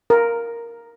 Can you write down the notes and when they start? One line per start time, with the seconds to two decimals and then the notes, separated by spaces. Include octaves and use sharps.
0.10 A#4